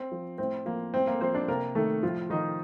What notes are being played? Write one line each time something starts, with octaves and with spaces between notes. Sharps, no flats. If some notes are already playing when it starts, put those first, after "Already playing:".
Already playing: C4
F3
A2 C4
F3 A#3
A2 C4
A#3 A#4
F3 C4 C5
D4 D5
C3 A#3 A#4
D#3 A3 A4
A2 F3 F4
D#3 F3 D#4